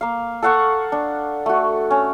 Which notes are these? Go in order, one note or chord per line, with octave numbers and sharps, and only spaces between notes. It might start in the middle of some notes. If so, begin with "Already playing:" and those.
A#3 F5
A4 F5 F#5 C#6
D4
A3 F#4
C#4